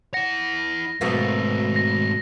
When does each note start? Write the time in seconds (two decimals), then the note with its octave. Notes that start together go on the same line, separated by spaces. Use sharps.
0.14 E4 F#5 A#6
1.01 G#2 B2 A3 A#3 C4
1.76 A#6